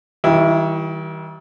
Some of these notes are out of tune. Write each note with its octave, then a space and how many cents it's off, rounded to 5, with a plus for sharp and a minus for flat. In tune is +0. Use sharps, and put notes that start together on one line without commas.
D#3 +40 G3 -25 E4 +15